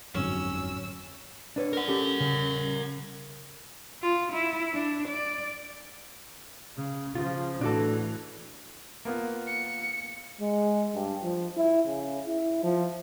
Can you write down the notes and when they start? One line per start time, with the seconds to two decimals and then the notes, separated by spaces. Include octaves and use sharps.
0.15 G1 F2 G#2 F#3 C#4 E6
1.56 D4 B4 C#5
1.73 A#4 F#5
1.88 C#4 G4 A4
2.20 C#3
4.02 F4
4.33 E4
4.74 D4
5.08 D5
6.76 C#3
7.15 C#3 F3 F4
7.61 A2 E3 D4 F#4 A4
9.05 A#3 B3 F4
9.47 C#7
10.41 G#3
10.94 G2
11.23 F3
11.57 E4
11.87 C#3
12.27 E4
12.63 F3